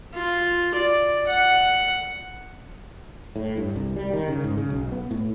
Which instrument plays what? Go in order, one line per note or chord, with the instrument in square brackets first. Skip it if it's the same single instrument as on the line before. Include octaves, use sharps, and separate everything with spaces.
[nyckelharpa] F4
D5
F#5
[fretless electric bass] A2
G2
C2
G3
D#3
C#3
G#2
C#3
B1
B3
A2